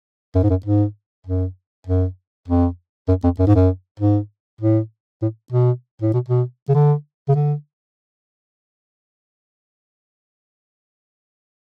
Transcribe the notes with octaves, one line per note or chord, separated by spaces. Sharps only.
F#2
G#2
F#2
G#2
F#2
F#2
F2
F#2
F2
F#2
G#2
F#2
G#2
A2
A2
B2
A2
B2
B2
C#3
D3
C#3
D3